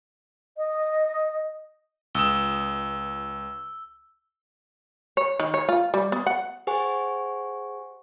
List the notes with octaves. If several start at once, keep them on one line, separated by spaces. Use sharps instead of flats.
D#5
C#2 D#6 E6 E7 G7
C#5
D#3
C#5
F4
G3
B3
F#5
G4 G#4 C5 F#5 G#5 C#6